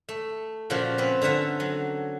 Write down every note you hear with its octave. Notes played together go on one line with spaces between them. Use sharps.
A3
A#2 C#3 F3 F4 F#4
C4 C#4 B4
D3 C#4 A4 E5 A#5
F#3